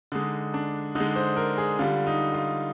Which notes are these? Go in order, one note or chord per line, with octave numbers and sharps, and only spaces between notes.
D3 G#3 D#4
D4
D3 G#3 D#4
C5
A#4
G#4
D3 G3 F4
D#4
F4